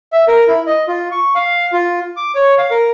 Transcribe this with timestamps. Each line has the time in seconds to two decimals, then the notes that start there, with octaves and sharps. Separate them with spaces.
0.13 E5
0.28 A#4
0.48 E4
0.67 D#5
0.88 F4
1.11 C#6
1.35 F5
1.73 F4
2.17 D6
2.35 C#5
2.58 F5
2.71 A#4